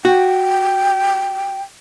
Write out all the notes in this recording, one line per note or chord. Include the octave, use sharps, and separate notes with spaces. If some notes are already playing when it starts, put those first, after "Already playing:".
F#4 G5